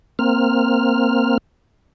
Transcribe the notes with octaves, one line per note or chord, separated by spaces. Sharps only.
A#3 C4 F6